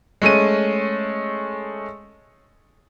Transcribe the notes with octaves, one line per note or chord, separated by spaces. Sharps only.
G#3 A3 C#4 D#7